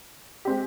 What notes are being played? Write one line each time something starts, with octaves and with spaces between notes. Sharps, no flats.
G#3 C4 G4